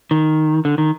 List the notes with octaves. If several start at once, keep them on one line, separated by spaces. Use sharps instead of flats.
D#3
D3
D#3